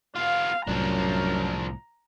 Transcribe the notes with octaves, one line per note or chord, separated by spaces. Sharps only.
B3 F4 F5
C2 F#2 A2 F3 D4 A#5